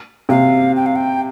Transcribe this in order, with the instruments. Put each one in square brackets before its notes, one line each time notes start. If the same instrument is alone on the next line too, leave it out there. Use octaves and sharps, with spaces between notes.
[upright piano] C3 [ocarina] F5
[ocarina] G5
F5
G5